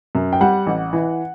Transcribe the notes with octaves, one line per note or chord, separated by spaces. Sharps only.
F#2
G5
G3 F#5
A1
E3